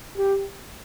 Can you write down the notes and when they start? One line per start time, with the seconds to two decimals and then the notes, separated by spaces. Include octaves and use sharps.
0.18 G4